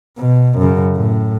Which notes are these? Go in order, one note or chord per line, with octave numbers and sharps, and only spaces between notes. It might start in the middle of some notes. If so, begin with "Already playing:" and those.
B2
F#2 C#3
A2